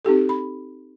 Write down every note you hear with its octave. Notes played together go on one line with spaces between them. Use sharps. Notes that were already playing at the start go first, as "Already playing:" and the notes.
C4 D#4 G4 A4
B5